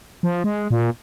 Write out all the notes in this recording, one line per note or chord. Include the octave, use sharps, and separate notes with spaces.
F3
G#3
A#2